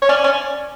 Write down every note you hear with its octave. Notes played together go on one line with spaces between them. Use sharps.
C#5
C#4 D5
C#4